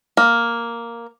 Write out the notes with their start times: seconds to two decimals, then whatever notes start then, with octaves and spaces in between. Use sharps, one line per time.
0.17 A#3